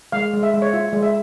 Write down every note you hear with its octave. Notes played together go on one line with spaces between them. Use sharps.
G#3 F5
G#3
E5
G#3
C#5
F4 E5
G#3
E5